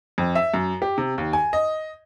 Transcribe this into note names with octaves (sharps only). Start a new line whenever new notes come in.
F2
E5
F#2
G4
C3
D#2
G#5
D#5